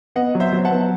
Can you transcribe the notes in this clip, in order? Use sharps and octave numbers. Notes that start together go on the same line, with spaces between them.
B3 D#5 F#5
F#3
C5 E5
F#3
F#5 A5
B3